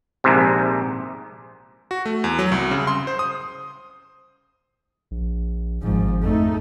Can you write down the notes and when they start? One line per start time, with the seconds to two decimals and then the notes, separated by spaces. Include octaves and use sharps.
0.24 A#1 G#2 C3
1.91 F#4
2.06 A3
2.24 E2
2.39 F#3
2.52 C2
2.71 C#3
2.87 C6
3.07 C5
3.19 D#6
5.11 A#1
5.82 G#1 G#2 F3
6.23 F2 A3 D#4